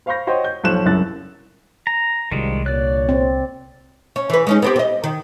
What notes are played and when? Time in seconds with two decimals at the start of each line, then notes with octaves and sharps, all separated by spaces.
0.06 C5 F5 B5 C#6 G6 A#6
0.27 F#4 C5 C#5 D#5 G5
0.44 G6
0.64 B1 F3 C#5 F#6 E7
0.85 F#1 C2 F#2 E4 F#6 A6
1.87 A#5
2.31 C2 F#2 D#3 F3 G3 G#3
2.66 A#2 D3 C#5 D5 F#6
3.09 C4
4.16 C#4
4.30 E3 B4
4.47 G#3 C#4 D#4
4.62 B3 C4 G4
4.76 C4 D#5
5.04 D#3